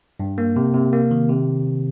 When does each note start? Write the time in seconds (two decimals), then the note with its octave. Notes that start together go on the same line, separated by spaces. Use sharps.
0.20 G2
0.38 A#3
0.56 C3
0.74 C3
0.93 A#3
1.11 D#3
1.29 C3